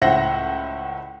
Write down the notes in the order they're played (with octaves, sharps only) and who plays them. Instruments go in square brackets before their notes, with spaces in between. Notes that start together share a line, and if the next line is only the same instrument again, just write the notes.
[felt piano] C#2 A2 C5 E5 F#5 A#6